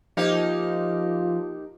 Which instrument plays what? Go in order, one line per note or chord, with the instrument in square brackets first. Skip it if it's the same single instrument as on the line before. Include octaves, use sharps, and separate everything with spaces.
[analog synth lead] F3 [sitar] A#3 D#4 G4